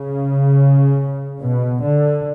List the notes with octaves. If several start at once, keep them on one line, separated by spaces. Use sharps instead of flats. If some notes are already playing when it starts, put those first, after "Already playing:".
Already playing: C#3
B2
D3